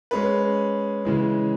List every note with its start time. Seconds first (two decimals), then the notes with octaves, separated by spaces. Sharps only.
0.11 G#3 C#4 G#4 B4
1.05 C#3 E3 G#3